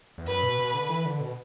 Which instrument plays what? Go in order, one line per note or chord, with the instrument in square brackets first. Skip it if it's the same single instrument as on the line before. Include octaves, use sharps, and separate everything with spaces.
[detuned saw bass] E2
[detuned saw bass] F#2 [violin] B4
[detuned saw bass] B2
B2
D3
E3
D3
B2